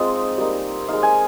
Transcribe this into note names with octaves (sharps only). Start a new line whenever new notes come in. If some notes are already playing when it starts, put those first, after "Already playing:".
Already playing: G#3 C4 D#4 F4 D#5
G3 A#3 D#4
G#3 D#4 F5
G#5